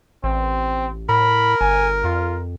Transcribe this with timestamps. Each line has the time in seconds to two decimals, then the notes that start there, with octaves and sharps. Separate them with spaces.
0.24 A1 C4
1.09 A2 A#4 B5
1.61 G1 G#5
2.04 F2 F4